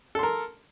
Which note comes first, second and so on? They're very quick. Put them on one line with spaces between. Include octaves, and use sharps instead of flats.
A4 C6 A#4